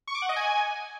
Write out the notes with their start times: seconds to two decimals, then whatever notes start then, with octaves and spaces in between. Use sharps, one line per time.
0.07 C#6
0.15 D6
0.22 F#5
0.29 D#5
0.36 G#5